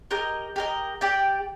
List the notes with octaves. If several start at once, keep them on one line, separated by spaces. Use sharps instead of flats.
G4 A#4 D#5
G4 A#4 D#5
G4 D5 G5